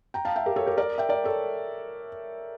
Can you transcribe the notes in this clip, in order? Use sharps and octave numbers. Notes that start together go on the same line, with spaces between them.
G5 A#5
F5 A5
E5 G5
G4 A#4
A4 C#5
G4 A#4
A#4 D5
E5 G5
A#4 D5
A4 C#5